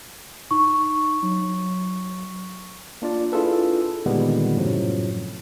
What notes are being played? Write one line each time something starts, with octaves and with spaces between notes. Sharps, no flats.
D#4 C#6
F#3
A#3 D4 F4 D5
D4 E4 F4 G#4 A4 B4
A#2 D3 D#3 G3 G#3 B3
F#2 A2 C3 F3 F#3